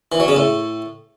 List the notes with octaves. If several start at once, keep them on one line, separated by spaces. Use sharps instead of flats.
E3
F#3
C#3
A2